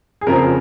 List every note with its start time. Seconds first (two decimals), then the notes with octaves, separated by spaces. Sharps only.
0.21 G#4
0.27 F2 C#3 F3 C4 A#4